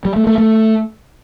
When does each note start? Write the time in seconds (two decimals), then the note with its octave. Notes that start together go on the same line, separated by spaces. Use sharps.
0.05 G3
0.16 A3
0.27 A3
0.38 A3